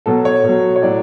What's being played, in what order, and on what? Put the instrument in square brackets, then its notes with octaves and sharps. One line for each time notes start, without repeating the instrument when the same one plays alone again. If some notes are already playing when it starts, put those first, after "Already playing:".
[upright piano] B2 F#3 A4
C#5
B2 F#3
C#5
A2 F#3 D5